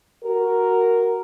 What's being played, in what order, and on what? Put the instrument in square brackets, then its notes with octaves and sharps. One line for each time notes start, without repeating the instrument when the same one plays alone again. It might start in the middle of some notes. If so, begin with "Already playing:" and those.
[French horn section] F#4 A#4